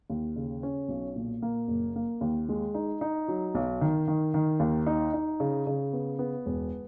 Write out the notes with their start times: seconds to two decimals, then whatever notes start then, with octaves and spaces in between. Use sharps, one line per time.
0.10 D#2
0.36 C#3
0.63 C#4
0.89 B1
1.16 A#2
1.42 A#3
1.68 F#1
1.96 A#3
2.21 D#2
2.49 G#3
2.74 D#4
3.01 D#4
3.28 F#3
3.55 B1
3.81 D#3
4.08 D#3
4.34 D#3
4.60 D#2
4.87 D#4
5.14 D#4
5.40 C#3
5.67 C#3
5.93 B3
6.19 B3
6.46 E1